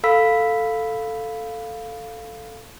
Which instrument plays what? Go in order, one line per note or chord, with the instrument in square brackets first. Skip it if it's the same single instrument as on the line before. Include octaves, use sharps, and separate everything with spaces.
[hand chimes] A4 F5 B5 E6 B6